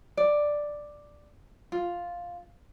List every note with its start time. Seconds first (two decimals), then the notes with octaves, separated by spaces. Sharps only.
0.17 D5
1.72 F4